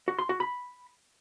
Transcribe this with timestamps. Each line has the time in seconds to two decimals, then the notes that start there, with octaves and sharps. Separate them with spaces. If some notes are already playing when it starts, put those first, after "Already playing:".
0.08 F#4
0.19 C6
0.29 F#4
0.40 B5